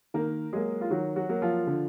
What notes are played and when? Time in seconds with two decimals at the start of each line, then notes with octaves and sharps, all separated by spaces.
0.14 D#3 A#3 A#4
0.52 F#3 G#3 A#3 G#4
0.81 F4
0.90 D#3 F#3 F#4
1.16 F#3 F#4
1.29 F#3 A#3
1.42 F3 F4
1.67 D3